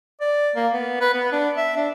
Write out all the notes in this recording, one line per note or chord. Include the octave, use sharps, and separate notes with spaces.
D5
A#3
B3
B4
B3
D4
E5
D4